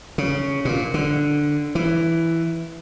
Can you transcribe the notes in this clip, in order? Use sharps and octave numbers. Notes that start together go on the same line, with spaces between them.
C#3
A#2
D3
E3